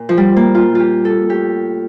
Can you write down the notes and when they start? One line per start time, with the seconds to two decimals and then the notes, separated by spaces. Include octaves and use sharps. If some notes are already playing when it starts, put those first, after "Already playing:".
Already playing: A#2
0.09 F3
0.17 G3
0.36 A#3
0.54 A#2 F4
0.75 F4 G4
1.05 A4
1.29 A2 G4